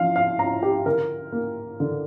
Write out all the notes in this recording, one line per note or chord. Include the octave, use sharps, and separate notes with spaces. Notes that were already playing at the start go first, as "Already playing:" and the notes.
Already playing: F3 F5
F5
F4 A#5
G4
D3 A#4
A#3
D3